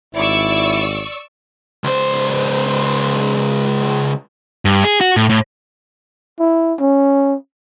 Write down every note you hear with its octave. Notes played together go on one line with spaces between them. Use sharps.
G#1 E4 D5 C#6 E6
C#2 C5
G2
G#4
F#4
A2
A2
E4
C#4